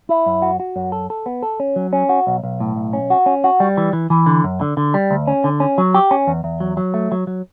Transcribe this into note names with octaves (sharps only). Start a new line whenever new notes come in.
E4
F#2
F#4
F#4
F#2
A4
A4
B3
A4
C#4
F#3
C#4
F#4
B1
B1
A2
B1
C#4
F#4
C#4
F#4
G3
E3
E3
E3
D3
F#2
D3
D3
G3
D2
C#4
D3
C#4
F#3
G4
C#4
E2
E2
F#3
F#3
A3
F#3
F#3